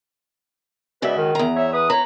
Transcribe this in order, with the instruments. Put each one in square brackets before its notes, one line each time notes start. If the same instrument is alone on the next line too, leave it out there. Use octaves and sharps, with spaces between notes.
[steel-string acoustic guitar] G#2 C#3 F#4 [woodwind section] B4 D5 E5
[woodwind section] D#3
[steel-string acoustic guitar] E2 A#5
[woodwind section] C#5 E5
B4 D#6
[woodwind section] E4 C#5 A#5 [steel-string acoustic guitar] B4